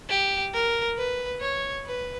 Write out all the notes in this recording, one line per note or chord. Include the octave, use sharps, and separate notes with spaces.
G4
A#4
B4
C#5
B4